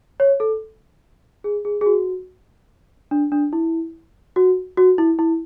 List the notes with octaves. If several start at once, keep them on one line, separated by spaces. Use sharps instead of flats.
C#5
A4
G#4
G#4
G#4
F#4
D4
D4
E4
F#4
F#4
E4
E4